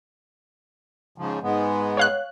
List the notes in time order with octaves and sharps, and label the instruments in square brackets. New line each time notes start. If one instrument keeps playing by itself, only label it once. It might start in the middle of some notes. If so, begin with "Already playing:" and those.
[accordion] G#2 C#3 F3
G#2 G#3 B3
[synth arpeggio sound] C#5 F5 F#6